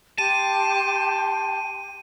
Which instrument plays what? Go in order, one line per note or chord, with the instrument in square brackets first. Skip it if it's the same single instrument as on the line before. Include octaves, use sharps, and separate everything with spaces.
[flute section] G4 G5 C6 [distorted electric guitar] A5 [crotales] D#7